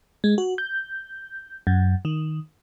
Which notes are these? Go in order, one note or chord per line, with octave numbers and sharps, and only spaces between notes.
G#3
F#4
G6
F#2
D#3